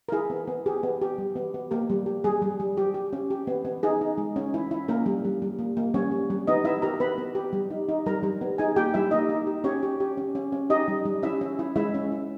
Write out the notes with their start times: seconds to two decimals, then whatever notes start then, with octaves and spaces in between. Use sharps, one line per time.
0.09 A#4
0.12 E4 G#4
0.30 B3
0.47 B3
0.66 G4 G#4
0.83 B3
1.02 G4
1.18 G3
1.36 B3
1.54 B3
1.71 A#3 G4 A#4
1.90 G3
2.06 G4
2.24 G3 G#4
2.42 G3
2.60 G3
2.77 G3 G4
2.94 G4
3.13 C#4
3.30 G4
3.47 B3
3.65 B3
3.83 D#4 G#4
4.01 D#4
4.18 G#3
4.36 C#4
4.54 E4
4.71 E4
4.88 A#3 C#4 A#4
5.06 G3
5.25 G3
5.42 G3
5.59 A#3
5.77 A#3
5.94 G3 C#4 C#5
6.12 G3
6.30 G3
6.47 B3 D#4 D#5
6.64 B3 E4 E5
6.82 G4 A#4 A#5
7.00 B3 B4 B5
7.18 B3
7.35 G4
7.53 G3
7.70 D#4
7.89 D#4
8.06 G3 A#4 A#5
8.23 G3
8.41 B3
8.58 D#4 G#4 G#5
8.76 A#3 G4 G5
8.94 G3 E4 E5
9.11 A#3 D#4 D#5
9.29 D#4
9.47 G4
9.64 C#4 G4 C#5
9.83 G4
10.00 G4
10.17 C#4
10.35 C#4
10.52 C#4
10.70 D#4 G4 D#5
10.88 G3
11.05 G3
11.23 C#4 E4 E5
11.41 C#4
11.59 E4
11.76 G#3 E4 E5
11.94 C#4
12.12 E4